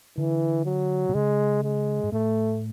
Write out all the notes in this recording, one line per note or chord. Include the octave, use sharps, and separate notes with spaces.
D3 E3
F#3
B2
C#3 G#3
G#3
G#2
A2 A3